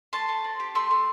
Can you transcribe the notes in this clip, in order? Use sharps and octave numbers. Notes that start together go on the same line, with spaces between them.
A3 A5 C6
A3
C4
G4
A3 C6 E6
A3